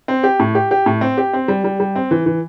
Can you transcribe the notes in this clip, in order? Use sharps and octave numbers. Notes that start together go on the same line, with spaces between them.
C4
G4
A2
G4
G4
A2
C4
G4
C4
G3
G3
G3
C4
E3
E3